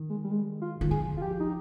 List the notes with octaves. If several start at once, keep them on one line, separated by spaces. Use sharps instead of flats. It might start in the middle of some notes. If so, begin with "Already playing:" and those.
Already playing: D#3
G#3
G3
G#3
F4
D#3
F3 G#4
F4
G4
D#4